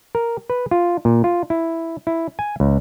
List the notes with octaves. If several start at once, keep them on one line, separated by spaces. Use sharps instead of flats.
A#4
B4
F4
A#2
F4
E4
E4
G#5
C#2